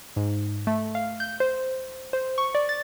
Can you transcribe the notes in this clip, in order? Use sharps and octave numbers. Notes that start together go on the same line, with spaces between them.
G#2
A3
F5
G6
C5
C5
C#6
D5
A6